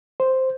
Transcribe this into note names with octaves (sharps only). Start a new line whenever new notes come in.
C5